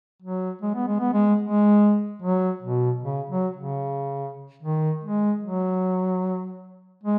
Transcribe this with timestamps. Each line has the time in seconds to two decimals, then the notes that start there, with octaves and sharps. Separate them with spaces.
0.22 F#3
0.62 G#3
0.75 B3
0.88 G#3
1.00 B3
1.13 G#3
1.42 G#3
2.22 F#3
2.62 B2
3.03 C#3
3.30 F#3
3.57 C#3
4.63 D#3
5.03 G#3
5.43 F#3
7.04 G#3